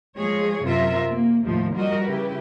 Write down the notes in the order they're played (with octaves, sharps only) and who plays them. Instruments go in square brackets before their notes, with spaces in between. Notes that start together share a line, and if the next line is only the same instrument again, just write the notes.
[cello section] F3 G#3 G#4 C#5
F#2 C3 F4 A#4 E5
A#3
D#2 A2 C3 D#3 F3
F3 G3 F#4 A#4 D#5
C#3 E4 G4 B4